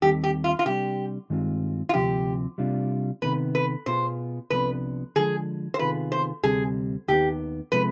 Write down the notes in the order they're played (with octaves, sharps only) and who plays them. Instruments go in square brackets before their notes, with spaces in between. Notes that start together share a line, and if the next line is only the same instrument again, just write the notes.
[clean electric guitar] D#2 D#3 G3 C4 [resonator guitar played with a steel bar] G4
[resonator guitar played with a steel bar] G4
F4
F4
[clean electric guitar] C3 G3 D4 [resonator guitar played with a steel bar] G4
[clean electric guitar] G2 D#3 G#3 C4 F4
[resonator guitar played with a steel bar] F4
[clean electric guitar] D2 C3 F3 C4 [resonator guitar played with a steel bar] G4
[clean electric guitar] C3 G3 D4 F4
[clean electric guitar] C3 D#3 B3 [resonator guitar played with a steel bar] B4
[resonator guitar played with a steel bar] B4
[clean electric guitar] B2 B3 F4 G#4 [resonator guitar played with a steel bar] C5
[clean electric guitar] C2 C3 F3 B3 D4 [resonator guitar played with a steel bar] B4
[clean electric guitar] D3 F3 G#3 [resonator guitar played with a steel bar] G#4
[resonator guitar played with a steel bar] C5
[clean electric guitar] C3 D#3 B3 F4 G#4 [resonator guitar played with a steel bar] B4
[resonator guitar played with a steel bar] C5
[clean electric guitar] D2 C3 G3 C4 [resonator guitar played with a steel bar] G#4
[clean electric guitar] D#2 D#3 B3 [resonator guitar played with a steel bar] G4
[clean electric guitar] C3 F3 G#3 B3 [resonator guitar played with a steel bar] B4